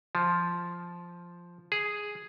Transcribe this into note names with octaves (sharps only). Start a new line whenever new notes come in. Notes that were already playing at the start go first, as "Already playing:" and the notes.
F3
G#4